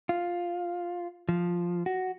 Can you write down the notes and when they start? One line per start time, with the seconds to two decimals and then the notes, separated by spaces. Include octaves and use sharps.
0.09 F4
1.29 F3
1.86 F#4